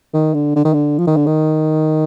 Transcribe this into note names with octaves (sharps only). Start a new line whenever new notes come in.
D#3
D3
D3
D#3
D3
F3
D#3
D3
D#3